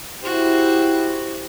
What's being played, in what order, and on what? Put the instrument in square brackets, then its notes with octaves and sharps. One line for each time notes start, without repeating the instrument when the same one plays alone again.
[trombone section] E4 G4 [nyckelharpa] F#4 C5